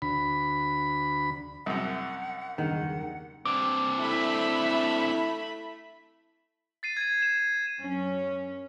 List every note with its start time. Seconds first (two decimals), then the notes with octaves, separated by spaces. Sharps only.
0.02 D2 B5
1.66 C2 F#2 F#5
2.58 F#1 E2 G2 D#3 F#5
3.46 C4 D4 D6
3.99 A3 E4 E5 B5
6.83 A6 C7 D#7
6.97 G#6 D#7
7.22 G#6 E7
7.80 F#2 C#4